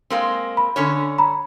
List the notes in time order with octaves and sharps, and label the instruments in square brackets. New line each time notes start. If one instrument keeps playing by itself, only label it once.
[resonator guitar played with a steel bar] G#3 A#3 C4
[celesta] B5
[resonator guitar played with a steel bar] D3 C#4 C#5
[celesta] A#5 B5